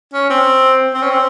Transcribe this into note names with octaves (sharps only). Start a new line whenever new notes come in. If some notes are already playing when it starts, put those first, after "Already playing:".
C#4
C4
C4
C#4
C4